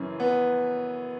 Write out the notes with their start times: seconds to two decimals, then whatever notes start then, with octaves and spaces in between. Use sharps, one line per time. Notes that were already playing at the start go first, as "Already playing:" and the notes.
Already playing: F#2 C#3 E3 C#4
0.20 B3